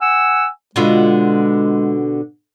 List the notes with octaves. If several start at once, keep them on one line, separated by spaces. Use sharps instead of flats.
F#5 G#5 E6
B2 D3 G#3 F4